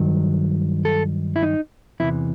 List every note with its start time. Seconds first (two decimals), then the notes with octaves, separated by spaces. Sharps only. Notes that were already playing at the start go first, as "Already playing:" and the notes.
Already playing: G2 D#3 F#3
0.85 A4
1.36 E4
1.43 D#4
2.00 E2 C3 E3 E4